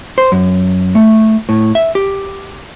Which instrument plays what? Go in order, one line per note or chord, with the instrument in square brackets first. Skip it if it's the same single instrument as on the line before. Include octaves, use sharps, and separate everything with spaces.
[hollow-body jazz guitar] C5
F#2
A3
A2
E5
G4